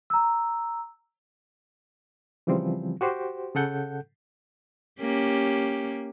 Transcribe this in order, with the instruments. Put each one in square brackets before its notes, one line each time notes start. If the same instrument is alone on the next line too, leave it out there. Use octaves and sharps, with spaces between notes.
[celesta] A#5 E6
[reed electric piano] C#3 E3 F3 G3 C4
F#4 G4 C5
C#3 A4 F#5 G6
[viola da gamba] A#3 C#4 G4